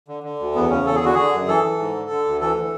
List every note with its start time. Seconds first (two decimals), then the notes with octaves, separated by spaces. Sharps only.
0.08 D3
0.23 D3
0.39 D2
0.55 E2 B3
0.70 C#3 C#4
0.86 E2 A4
0.95 G#4
1.01 D3 F#4
1.15 D3 G#4
1.33 F#2
1.47 E3 A4
1.64 E3
1.79 G#2
1.95 D3
2.10 D3
2.26 D2
2.41 E3 A4
2.56 E3